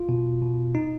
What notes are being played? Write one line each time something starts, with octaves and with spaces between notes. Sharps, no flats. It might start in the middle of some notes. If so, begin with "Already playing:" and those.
Already playing: F4
B2
B2
D#4